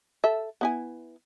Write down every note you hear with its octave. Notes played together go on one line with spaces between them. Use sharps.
A4 E5
B3 E4 G#5